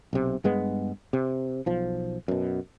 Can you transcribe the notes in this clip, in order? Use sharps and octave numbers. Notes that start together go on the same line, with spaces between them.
B1 C3
G2 G#3 B3
C3
B1 F3
F#2 B2